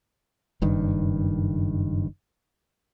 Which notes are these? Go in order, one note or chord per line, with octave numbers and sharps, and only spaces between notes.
F#1 G2 D#3